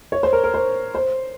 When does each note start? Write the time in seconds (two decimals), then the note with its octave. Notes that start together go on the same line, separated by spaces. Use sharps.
0.12 C#5
0.23 C5
0.33 A#4
0.44 A#4
0.54 C5
0.95 C5